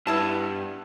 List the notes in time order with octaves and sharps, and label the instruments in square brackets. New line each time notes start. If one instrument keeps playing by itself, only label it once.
[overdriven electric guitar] G2 [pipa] B3 E4 A5